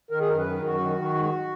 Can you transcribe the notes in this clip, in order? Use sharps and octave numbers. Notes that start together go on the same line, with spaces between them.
D#3 A#4
G#4
F#2 A#4
B4
D#3
F#2 F#4
D#3
D#3
G#2